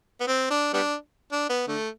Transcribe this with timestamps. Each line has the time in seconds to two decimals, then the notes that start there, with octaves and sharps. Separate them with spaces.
0.20 B3
0.27 C4
0.50 D4
0.73 G3 B3 D4
1.32 D4
1.50 B3
1.68 D3 A3